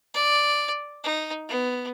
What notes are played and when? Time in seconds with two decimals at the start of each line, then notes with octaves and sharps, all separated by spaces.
0.14 D5
1.04 D#4
1.49 B3